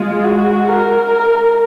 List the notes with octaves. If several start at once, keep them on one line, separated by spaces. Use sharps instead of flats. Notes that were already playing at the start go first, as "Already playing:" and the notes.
Already playing: G#3 F4
F#4
A#4